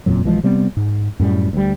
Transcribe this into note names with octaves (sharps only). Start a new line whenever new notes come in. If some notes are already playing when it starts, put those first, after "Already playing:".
F#1 F2 A#2 F#3
B1 E3 F3 G#3
C3 G3 B3 C4
G#2
F#2 A2 G3
D2 G3